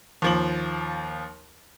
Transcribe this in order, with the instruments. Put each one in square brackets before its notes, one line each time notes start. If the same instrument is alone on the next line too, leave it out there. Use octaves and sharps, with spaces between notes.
[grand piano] D#2 F3 F#7